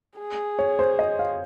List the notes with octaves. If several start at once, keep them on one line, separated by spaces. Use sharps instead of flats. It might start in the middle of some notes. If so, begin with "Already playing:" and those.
G#4
C#5
C5
D#5
F5